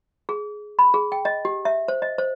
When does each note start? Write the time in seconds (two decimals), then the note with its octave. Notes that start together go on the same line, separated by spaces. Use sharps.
0.29 G#4
0.79 B5
0.94 G#4
1.12 G5
1.25 D#5
1.45 G4
1.65 E5
1.88 C5
2.02 D#5
2.18 C5